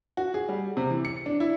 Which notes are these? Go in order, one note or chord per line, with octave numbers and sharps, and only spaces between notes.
F#4
G#4
G3
C3
E3
C#7
D4
E4